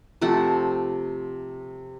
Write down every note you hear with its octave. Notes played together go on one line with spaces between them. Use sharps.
C3 F3 A3 F#5